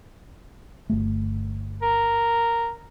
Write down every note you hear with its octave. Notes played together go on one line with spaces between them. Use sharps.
G1 A3
A#4